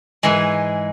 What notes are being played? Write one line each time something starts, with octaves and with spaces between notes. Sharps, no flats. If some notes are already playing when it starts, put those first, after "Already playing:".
G#2 E3 G#3